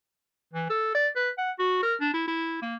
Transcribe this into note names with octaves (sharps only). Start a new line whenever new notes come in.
E3
A4
D5
B4
F#5
F#4
A#4
D4
E4
E4
A#3